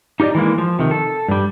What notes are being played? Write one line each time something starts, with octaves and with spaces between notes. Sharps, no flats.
D#4 G4 A4 D5 D#5
E3 G#3 A#3
F3
C3 D#3
A4
G2 G3